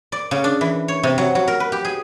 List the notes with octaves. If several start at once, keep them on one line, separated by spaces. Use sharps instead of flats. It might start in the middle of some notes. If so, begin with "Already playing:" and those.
D5
C#3
D4
E3
C#5
C3
F#3
F#3
A#4
B4
G4
G#4